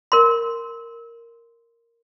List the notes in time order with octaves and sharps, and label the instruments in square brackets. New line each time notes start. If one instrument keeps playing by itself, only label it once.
[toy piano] A#4 C6